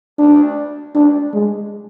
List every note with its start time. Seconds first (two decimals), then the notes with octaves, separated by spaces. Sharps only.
0.18 D4
0.95 D4
1.34 G#3